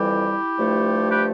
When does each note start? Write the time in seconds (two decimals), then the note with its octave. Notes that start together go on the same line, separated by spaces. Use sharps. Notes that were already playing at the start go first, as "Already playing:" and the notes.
Already playing: F2 E3 G3 E4 G4
0.57 G2 F3 A3
1.11 G4 B4